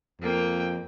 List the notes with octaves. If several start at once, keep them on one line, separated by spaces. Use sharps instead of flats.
F2 A#3 G5